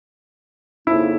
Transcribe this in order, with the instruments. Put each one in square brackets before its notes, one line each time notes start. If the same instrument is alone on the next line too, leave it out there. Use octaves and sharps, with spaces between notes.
[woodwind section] F2 C#3 F3 A#3 D#4 [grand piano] E4